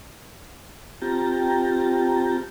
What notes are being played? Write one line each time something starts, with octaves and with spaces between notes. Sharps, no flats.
C4 F4 G4 G5 A5 A#5